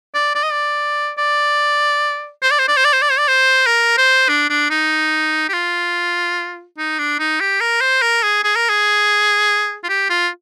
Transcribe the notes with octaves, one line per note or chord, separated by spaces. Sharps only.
D5
D5
D#5
D5
D5
C5
D5
C5
D5
C5
D5
C5
D5
C5
D5
C5
A#4
C5
D4
D4
D#4
G4
F4
D#4
D4
D#4
G4
A#4
C5
A#4
G#4
G#4
A#4
G#4
F4
G4
F4